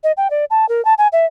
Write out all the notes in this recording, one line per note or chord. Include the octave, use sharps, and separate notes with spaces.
D#5
G5
D5
A5
A#4
A5
G#5
E5